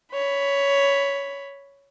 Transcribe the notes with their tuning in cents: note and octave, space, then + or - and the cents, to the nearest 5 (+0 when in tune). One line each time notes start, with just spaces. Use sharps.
C#5 +10 B5 +0